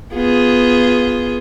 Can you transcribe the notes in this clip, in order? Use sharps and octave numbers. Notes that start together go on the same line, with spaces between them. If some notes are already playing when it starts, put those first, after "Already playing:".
B3 F4 G#4